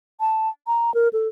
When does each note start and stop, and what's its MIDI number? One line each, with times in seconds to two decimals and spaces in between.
0.20 0.49 81
0.67 0.94 82
0.94 1.08 70
1.13 1.28 69